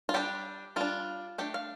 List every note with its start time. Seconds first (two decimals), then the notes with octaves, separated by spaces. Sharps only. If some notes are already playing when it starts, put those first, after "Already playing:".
0.09 F4
0.14 G3 D4 G4
0.76 G3 D4 F4
1.38 A3 D4 G4
1.54 F5